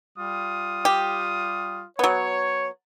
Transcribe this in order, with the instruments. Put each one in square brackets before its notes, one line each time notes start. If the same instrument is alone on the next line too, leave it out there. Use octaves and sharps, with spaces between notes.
[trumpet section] G3 F4 D#6
[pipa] G4
[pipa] F#3 B3 [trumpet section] C#5